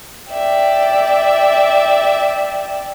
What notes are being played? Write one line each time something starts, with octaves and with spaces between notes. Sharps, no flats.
D5 E5 G5